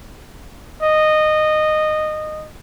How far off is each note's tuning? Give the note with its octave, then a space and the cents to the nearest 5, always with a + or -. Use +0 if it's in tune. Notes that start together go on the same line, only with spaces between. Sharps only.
D#5 -15